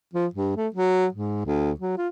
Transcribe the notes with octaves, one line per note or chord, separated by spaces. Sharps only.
F3
G2
A3
F#3
G#2
D2
F#3
F4